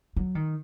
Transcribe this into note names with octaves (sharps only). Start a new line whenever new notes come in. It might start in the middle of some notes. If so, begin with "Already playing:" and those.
F#3
D#3